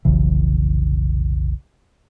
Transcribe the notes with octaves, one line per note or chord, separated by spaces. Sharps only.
F1 B1 C#3 E3